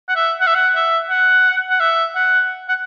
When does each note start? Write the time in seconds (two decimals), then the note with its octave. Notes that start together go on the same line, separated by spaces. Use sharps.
0.08 F#5
0.15 E5
0.40 F#5
0.47 E5
0.55 F#5
0.75 E5
1.09 F#5
1.69 F#5
1.80 E5
2.15 F#5
2.68 F#5